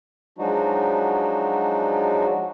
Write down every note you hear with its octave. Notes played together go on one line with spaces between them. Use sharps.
F3 F#3 G#3 D4 D#4 F#4